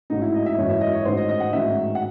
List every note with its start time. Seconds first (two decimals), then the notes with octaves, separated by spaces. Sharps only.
0.10 A1 G#2 F#3 D#4
0.22 E4
0.34 D#5
0.46 E5
0.58 G#1 F#2 E3 C#5
0.69 E5
0.81 D#5
0.93 C#5
1.05 A1 G#2 D#3 F#3 C5
1.17 D#5
1.29 D#5
1.40 F#5
1.53 A1 G#2 D#3 F#3 E5
1.95 F#5